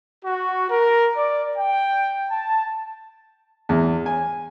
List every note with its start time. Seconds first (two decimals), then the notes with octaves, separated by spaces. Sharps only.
0.25 F#4
0.69 A#4
1.15 D5
1.56 G5
2.29 A5
3.69 E2
4.06 G#5